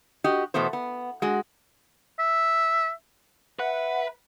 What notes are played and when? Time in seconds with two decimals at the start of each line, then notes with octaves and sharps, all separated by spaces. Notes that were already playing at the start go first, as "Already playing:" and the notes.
0.24 F#4 G4 D#5
0.54 E2 B2 A3 B3 C5
0.73 B3
1.22 G#3 F#4
2.19 E5
3.59 B4 E5 F#5